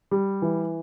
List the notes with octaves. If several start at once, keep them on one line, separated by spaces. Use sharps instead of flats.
G3
E3